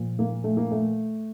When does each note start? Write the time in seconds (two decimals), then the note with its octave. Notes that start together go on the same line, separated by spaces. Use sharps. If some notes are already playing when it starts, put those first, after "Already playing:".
Already playing: A#2 F3
0.19 A#3
0.44 A3
0.57 A#3
0.71 A3